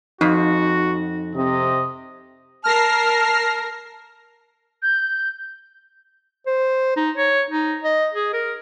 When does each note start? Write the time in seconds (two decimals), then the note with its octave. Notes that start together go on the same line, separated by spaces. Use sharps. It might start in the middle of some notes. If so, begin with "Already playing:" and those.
0.21 F2 D#4 F#4
1.35 C3 D#5
2.64 A#4 A5 F6 A#6 C7
4.82 G6
6.46 C5
6.97 D#4
7.16 C#5
7.51 D#4
7.84 D#5
8.14 G#4
8.33 A#4